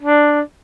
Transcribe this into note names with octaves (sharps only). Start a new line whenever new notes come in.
D4